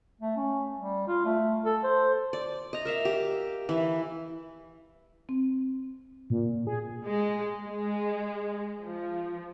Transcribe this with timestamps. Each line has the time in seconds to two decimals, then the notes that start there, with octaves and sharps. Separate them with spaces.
0.21 A3
0.37 C#4
0.79 G3
1.07 F4
1.25 A3
1.65 A4
1.84 C5
2.33 D5
2.73 D#5 A#5
2.85 A#4 E5 F5
3.05 G4
3.69 E3 E4
5.29 C4
6.30 A#2
6.67 G#4
7.05 G#3
7.64 G#3
8.83 F3